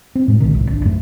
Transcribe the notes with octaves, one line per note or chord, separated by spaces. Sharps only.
C4
A2 G#3
C2 A#2 D3 D#3
D1 G1 C2
G#1 D4
F#2 A3